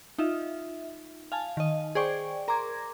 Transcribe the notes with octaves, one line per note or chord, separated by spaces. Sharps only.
D#4 F4 E5
F5 G#5 A5
D#3 D#5
G#4 C5 D5 G5 C#6
A#4 A#5 C6 D6 G#6